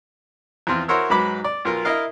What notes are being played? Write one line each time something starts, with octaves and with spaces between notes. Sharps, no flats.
E2 F3 C4 F4
E4 F#4 A#4 C5 C#5 E6
G#2 F#3 B4 B5 D6
D5
B1 F4 A#4
E4 A#4 D#5 F5